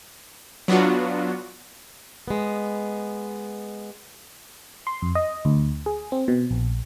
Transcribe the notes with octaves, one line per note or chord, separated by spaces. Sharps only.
F#3 B3 D4 F4 F#4
G#3 B3
C6
F2
D#5
D2
G#4
C4
B2
A#1